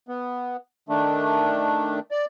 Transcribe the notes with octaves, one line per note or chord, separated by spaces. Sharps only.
B3
D#3 A3 D4
D5